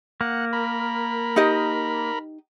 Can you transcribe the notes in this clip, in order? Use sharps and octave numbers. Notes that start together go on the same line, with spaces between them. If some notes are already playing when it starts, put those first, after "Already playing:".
A#3 F#5
A#4 B5
D#4 G4 D#5